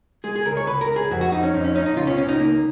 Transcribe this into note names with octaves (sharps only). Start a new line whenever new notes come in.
G#3 G#4
G#4
C#2 A#4
C#5
C#2 B4
A#4
C#2
G#4
F2 F#4
F#4
F2 D#4
C#4
F2 D#4
C#4
C#4 D#4
D#4
C#2 F4
C#4
C#2 C#4
D#4
A#3